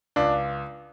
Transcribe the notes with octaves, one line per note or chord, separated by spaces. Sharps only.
C#2 D4